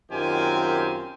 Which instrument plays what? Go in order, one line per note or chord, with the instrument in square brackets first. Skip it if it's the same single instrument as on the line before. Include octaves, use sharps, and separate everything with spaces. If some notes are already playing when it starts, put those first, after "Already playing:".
[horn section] F#2 D#3 C4 F4 G4 G#5